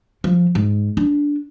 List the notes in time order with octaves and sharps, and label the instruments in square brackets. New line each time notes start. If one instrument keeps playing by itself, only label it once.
[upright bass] F3
G#2
D4